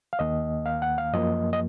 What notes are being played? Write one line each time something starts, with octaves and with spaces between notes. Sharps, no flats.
F5
D#2 D#3 A#3 D#5
F5
F#5
F5
F#2 F3 A#3 D#5
D#5